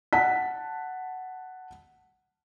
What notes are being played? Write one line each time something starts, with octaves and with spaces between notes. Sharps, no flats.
F#5 A5 B6